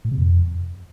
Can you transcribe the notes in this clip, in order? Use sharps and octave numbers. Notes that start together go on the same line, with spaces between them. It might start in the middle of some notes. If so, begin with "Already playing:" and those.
A2
C3
F2